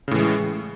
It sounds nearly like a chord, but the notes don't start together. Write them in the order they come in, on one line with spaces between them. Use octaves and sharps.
C#3 A2 E3 G#3